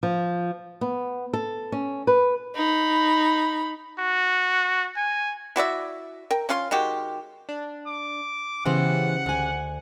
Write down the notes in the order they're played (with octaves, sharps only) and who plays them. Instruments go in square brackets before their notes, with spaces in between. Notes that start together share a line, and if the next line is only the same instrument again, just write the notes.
[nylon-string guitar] F3
B3
A4
C#4
B4
[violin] D#4 B5
[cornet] F#4
G#5
[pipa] E4 F#4 D5 E5
A#4 G5
C#4 F4 F5 C6
D#3 G#3 F#4 G4
[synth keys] D4
[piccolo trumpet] D6
[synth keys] C#3 G4 [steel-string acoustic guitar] E3 B3 C5 [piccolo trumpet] F#5
[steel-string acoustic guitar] D2 G#5